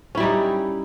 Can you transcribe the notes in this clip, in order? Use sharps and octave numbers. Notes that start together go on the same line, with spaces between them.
G3 C#4 D#4 E4